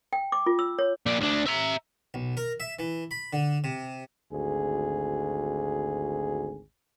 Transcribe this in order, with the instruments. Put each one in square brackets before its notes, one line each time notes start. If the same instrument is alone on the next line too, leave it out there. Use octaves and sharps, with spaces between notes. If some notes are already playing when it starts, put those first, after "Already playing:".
[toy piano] G5
D6
F4
E6
C#5
[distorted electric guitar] A#2 D4
D2 D4
E5 A#5
[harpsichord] B1
A#4
E5
E3
B5
D3
C3
[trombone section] G#1 D2 G#4